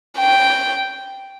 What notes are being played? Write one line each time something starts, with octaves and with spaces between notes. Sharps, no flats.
G5